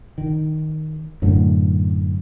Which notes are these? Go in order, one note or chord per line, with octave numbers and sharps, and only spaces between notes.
D#3
F#2 A2 D3